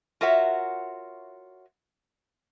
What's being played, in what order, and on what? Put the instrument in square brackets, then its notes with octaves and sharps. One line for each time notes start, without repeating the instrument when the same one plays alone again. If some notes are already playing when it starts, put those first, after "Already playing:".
[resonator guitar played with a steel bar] F4 F#4 A#4 C#5 E5 F#5